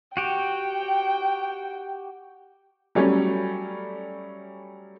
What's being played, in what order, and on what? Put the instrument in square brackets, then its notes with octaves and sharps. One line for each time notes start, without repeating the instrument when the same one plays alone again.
[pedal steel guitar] F#4 G4 [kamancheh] G5
[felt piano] F#3 G3 A3 C#4